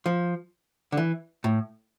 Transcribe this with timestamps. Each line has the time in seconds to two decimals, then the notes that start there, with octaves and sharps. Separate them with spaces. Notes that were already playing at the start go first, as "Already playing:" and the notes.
0.06 F3
0.92 D3
0.97 E3
1.44 A2